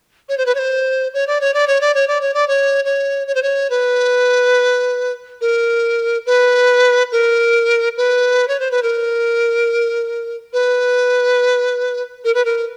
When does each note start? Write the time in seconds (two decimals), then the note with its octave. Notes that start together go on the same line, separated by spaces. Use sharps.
0.29 C#5
0.37 C5
0.46 B4
0.55 C#5
0.59 C5
1.14 C#5
1.27 D5
1.41 C#5
1.54 D5
1.67 C#5
1.81 D5
1.94 C#5
2.07 D5
2.21 C#5
2.34 D5
2.48 C#5
2.85 C#5
3.27 C#5
3.35 C5
3.43 C#5
3.70 B4
5.41 A#4
6.26 B4
7.12 A#4
7.97 B4
8.48 C#5
8.60 C5
8.71 B4
8.83 A#4
10.53 B4
12.24 A#4
12.34 B4
12.45 A#4